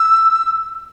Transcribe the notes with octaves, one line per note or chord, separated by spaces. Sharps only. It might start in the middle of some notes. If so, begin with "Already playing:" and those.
Already playing: E6